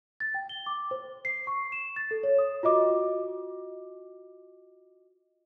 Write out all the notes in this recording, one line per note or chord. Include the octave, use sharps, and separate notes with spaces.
A6
G5
G7
D6
C5
C7
C#6
E7
A6
A4
C#5
D#6
F4 F#4 D#5 D6